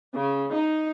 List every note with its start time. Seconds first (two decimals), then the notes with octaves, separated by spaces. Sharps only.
0.14 C#3
0.53 D#4